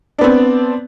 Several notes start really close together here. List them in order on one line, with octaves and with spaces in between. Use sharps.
D4 B3 C4